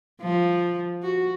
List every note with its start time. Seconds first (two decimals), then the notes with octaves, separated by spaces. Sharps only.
0.22 F3
1.03 F#4